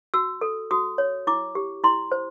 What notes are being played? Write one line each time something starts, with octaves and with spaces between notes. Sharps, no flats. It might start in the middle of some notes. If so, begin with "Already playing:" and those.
F#4 E6
A4
F#4 D#6
C#5
E4 D6
G4
E4 C6
C5